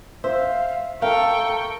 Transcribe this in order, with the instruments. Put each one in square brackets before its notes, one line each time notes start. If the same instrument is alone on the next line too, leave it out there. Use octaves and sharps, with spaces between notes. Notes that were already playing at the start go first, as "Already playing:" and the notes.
[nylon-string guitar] C5 [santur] E5 [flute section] F5
[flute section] A4 [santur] A#4 [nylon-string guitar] F5 [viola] G5 C#6